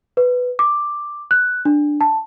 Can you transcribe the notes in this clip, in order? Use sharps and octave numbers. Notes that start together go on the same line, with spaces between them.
B4
D6
F#6
D4
A5